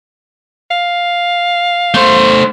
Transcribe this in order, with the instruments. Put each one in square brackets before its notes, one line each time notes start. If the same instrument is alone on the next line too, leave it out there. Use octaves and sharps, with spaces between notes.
[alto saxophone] F5
[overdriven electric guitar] A3 C5